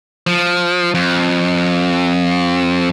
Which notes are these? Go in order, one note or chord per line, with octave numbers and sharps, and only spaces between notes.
F3
F2